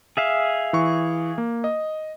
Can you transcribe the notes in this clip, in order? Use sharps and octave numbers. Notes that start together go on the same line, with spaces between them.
G#4 E5 F5
E3 C#6
A#3
D#5